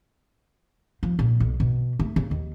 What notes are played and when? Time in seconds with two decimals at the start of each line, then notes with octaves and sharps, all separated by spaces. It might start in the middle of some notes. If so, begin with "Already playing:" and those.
1.03 F3
1.19 A#2
1.40 B1
1.60 B2
1.99 A3
2.16 C#3
2.31 D#2